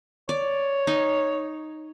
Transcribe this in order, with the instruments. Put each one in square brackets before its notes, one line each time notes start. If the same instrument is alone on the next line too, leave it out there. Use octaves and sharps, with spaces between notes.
[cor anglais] C#5 [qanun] D5
[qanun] D#4